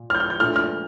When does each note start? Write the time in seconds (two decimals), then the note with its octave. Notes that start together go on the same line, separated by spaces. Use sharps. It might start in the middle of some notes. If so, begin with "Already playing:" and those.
Already playing: A#2
0.10 F6
0.15 G6
0.20 F6
0.30 G6
0.40 A#2 A3 D4 F6
0.56 F6